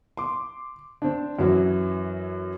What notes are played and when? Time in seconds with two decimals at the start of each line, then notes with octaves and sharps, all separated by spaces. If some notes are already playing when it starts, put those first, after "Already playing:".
0.17 C6 D6
1.02 C4 D4
1.39 F#2 E3 F#3